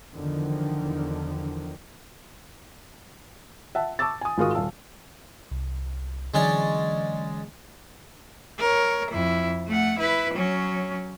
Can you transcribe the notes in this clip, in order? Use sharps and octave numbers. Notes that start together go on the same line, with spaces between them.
E2 D3 D#3 F3
E5 F#5 A5
A5 C#6 D6 E6 A6
G#5 D#6
G#1 G#3 F4 F#4 A#4 D#6
D#1 F5 A5 E6
C2
D3 E3 F#3 G#3 C#4 D5
A#4 C#5
F2 E4
A3 F#5
E4 B4
F#3 C#4